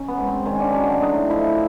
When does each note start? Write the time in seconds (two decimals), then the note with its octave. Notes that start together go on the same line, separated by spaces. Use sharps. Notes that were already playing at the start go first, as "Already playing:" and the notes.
Already playing: D#3 C#4
0.08 B3
0.18 G#2
0.28 C4
0.46 D#3 C#4
0.60 D4
0.73 F#3 C#4
0.88 D4
1.01 A2 D#4
1.30 F3 E4